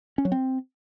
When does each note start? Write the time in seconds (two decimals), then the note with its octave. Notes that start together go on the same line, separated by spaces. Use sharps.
0.18 C#4
0.25 F#3
0.32 C4